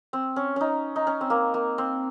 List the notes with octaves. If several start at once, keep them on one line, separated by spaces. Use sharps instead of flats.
C4
C#4
C#4 D#4
D#4
C#4
C4
A#3
A#3
C4